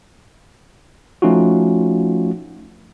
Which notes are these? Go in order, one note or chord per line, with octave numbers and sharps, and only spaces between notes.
F3 A3 C#4 D#4 F4 F#4